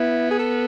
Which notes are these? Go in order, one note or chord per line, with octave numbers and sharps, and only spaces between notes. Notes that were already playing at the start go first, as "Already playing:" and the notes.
Already playing: B3 E4
G#4
A4